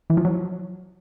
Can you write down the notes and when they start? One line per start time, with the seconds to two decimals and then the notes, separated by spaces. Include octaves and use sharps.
0.10 E3
0.17 F3
0.25 F#3